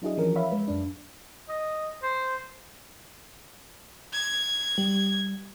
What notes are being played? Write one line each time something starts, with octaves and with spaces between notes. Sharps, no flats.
F#3 D4 E4 F#4 G#4 D#5
E3 F3 C#4 A#4
C#5 E5 F5 B5
G#3 B4
F#2 D4
D#5
C5
G#6
G3